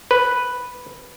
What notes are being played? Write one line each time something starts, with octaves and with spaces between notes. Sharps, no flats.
B4